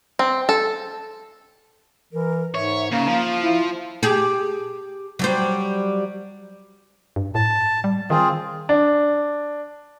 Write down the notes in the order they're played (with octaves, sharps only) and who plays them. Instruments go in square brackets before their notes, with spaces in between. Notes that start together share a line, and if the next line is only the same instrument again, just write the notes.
[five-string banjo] C4
A4
[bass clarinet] E3 [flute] A#4
[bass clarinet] G#2 [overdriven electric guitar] C#5 [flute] E5
[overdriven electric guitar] C#3 [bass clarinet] A#3 [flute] F5
[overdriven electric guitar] F3
[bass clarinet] E4
[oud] G4 G#4
F#3 G3 C5
[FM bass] G2
[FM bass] A2 [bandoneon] A5
[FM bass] G3
[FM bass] D#3 [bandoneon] C4 F4 G#4
[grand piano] D4